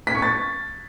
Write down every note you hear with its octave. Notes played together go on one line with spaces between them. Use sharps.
B6
C#6
A6